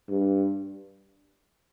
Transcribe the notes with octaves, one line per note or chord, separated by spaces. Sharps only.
G2